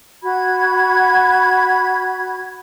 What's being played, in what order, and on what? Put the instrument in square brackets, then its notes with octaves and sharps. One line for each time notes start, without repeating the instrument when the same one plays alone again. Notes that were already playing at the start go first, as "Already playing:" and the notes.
[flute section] F#4 B5 G#6